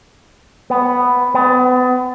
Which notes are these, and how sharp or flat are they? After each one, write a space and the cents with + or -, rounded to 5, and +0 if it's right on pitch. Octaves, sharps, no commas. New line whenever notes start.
B3 +5
B3 +35